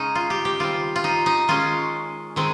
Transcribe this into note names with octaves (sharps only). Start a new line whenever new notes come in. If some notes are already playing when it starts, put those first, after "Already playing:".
Already playing: C#3 G#3 C#4 D#4
F4
G4
G4
D#3 G3 C4 F4
F4
D#4
D#4
D#3 G#3 C#4 F4
D#3 G#3 C4